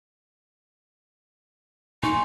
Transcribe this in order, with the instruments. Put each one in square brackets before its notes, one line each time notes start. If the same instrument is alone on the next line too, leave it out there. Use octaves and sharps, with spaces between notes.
[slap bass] A#2 A3 [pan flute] D#4 [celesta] G#5 C6 C#6